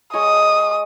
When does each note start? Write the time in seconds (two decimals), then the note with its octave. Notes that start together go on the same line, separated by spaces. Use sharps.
0.14 G#3 C#5 D#5 D#6